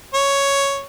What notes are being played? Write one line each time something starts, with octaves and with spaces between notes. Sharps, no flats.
C#5